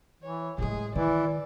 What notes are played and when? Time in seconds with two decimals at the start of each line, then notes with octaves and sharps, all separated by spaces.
0.22 E3 C#5
0.58 A2 G#3 A3 G#4
0.95 D#3 E3 E4 D5